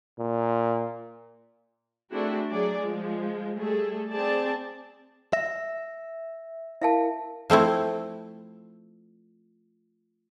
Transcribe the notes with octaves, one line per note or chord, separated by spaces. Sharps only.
A#2
A3 C4 D4 E4 F#4 G#4
F#3 G#4 D5
F3 G#3
G3 A3 G#4 A4
C4 G#4 D5 A5
E5 A#6
E4 A#4 E5 F5 A5
F3 A3 C4 E4